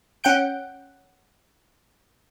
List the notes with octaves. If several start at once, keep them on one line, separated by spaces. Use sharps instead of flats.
C#4 F#5 G5 G6 D7